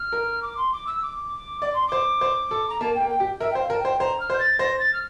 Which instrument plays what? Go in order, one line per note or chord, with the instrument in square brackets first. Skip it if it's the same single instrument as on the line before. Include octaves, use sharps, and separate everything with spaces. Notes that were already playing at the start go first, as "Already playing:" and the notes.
Already playing: [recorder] F6
[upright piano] A#4
[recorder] D6
C6
D6
E6
D6
[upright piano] D5 [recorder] D6
[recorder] C6
[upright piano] C5 [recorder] D6
[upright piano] C5
A4
[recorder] A#5
[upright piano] A#3 [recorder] A5
[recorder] G5
[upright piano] A#3
[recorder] G5
[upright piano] G4
[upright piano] A#4 [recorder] E5
[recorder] G5
[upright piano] C5
[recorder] F5
[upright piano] A#4 [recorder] A5
[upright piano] C5 [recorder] G5
[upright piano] C5 [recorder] A#5
[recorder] F6
[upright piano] C5 [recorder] G6
[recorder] A6
[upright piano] C5 [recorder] A#6
[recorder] A6
F6